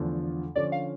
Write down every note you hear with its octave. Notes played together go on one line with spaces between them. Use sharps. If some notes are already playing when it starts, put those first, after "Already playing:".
Already playing: E2 D3 F3 A3
D3 F3 C#4 D5
F5